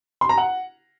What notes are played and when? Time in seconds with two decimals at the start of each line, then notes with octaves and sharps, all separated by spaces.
0.21 C6
0.29 A#5
0.38 F#5